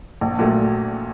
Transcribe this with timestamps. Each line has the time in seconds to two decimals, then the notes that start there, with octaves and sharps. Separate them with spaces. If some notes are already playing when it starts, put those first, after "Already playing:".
0.21 A#1
0.39 A#2 F#3 A3